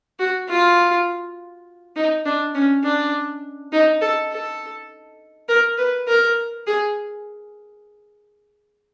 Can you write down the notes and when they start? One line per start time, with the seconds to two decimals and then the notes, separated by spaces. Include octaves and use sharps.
0.19 F#4
0.49 F4
1.96 D#4
2.25 D4
2.54 C#4
2.84 D4
3.73 D#4
4.01 A4
4.32 A4
5.49 A#4
5.78 B4
6.08 A#4
6.67 G#4